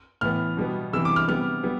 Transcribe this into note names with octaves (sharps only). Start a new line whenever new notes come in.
A2 E3 B3 F6
B2 G3 B3
C3 E3 G3 B3 E6
D6
F6
C3 G3 B3 F6
G3 B3